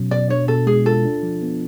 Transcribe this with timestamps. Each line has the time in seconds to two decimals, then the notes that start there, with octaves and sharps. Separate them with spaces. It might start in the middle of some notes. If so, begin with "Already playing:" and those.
Already playing: B2 F#3 C#4
0.11 B2 D5
0.30 D4 C#5
0.48 B2 A4
0.67 G#3 G#4
0.86 F4 A4
1.05 D4
1.23 F3
1.42 B3